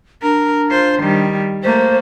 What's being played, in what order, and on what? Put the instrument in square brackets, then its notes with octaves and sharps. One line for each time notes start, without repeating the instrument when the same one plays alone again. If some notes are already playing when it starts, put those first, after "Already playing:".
[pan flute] D4 [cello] A#4
[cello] F4 C5
D#3 G3
[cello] A3 A#3 [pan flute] C5